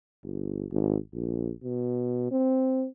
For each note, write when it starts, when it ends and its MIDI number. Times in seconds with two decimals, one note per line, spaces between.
0.23 0.65 31
0.72 0.96 32
1.13 1.52 34
1.63 2.30 47
2.31 2.86 60